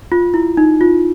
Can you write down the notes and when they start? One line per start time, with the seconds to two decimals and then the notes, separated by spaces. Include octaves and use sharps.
0.12 F4
0.34 E4
0.57 D#4
0.81 F4